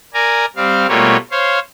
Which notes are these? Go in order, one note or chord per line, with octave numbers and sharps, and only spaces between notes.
A#4 D5 G#5 A#5
G3 C4 F5
B2 G3 A3 A#3 F4 C#5
C5 C#5 F5